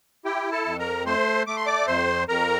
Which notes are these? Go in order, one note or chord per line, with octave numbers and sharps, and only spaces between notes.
E4 G4 G5
A4 A5
F2
A#4 A#5
A3 C5 C6
A3 D6
C6
D5 D6
F2 C5 C6
F2 A#4 A#5